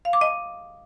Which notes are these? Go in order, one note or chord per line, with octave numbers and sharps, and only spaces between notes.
F5
D6
D#5